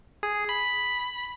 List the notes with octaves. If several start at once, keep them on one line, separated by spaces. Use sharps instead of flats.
G#4
B5